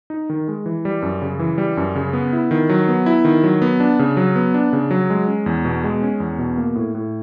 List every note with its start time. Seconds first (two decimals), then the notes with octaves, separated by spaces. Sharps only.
0.10 D#4
0.30 D#3
0.48 G#3
0.66 E3
0.85 G3
1.02 F#2
1.21 C#3
1.40 E3
1.58 G3
1.77 F#2
1.95 C#3
2.13 B3
2.33 E4
2.51 D#3
2.69 F#3
2.88 B3
3.06 E4
3.25 D#3
3.44 F#3
3.62 B3
3.80 D4
3.99 C#3
4.17 F#3
4.36 B3
4.54 D4
4.73 C#3
4.91 F#3
5.10 G#3
5.28 C#4
5.46 E2
5.65 B2
5.84 G#3
6.03 C#4
6.20 E2
6.38 B2
6.58 A#3
6.75 A2
6.95 A2